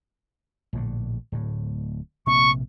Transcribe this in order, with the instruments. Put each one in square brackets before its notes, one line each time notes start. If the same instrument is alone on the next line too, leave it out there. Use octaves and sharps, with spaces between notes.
[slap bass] A#1 A2 D3
D1 A2
[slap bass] A#1 C3 A#3 [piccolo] C#6